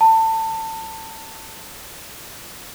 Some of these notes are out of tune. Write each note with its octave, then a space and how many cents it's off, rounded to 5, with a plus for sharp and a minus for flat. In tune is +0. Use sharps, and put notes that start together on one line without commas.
A5 +25